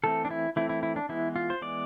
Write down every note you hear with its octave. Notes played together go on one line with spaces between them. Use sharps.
E3 A3 C4 A4
D4
E4
E3 A3 C4 E4
E4
E4
D4
E3 G#3 B3 E4
F4
C5
E3 G#3 B3 D5